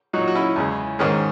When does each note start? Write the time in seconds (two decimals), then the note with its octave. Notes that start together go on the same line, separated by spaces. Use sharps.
0.13 A#2 F#3 D#4 F#4
0.28 F#4
0.35 C#4 E4
0.56 E2 C#3 G#3
0.99 G#2 D#3 G#3 C#4